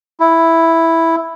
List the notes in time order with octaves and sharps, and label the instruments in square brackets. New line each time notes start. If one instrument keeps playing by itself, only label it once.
[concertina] E4